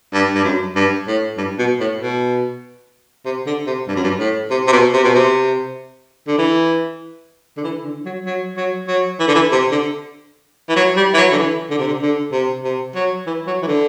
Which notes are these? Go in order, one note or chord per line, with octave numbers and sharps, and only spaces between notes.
G2
G2
F#2
G2
A2
G2
B2
A2
B2
C3
D3
C3
G2
F#2
G2
A2
C3
C3
B2
C3
B2
C3
D3
E3
D3
E3
D3
F#3
F#3
F#3
F#3
E3
D3
E3
C3
D3
E3
F#3
G3
E3
F#3
D3
E3
D3
C3
D3
D3
C3
C3
F#3
E3
F#3
E3
D3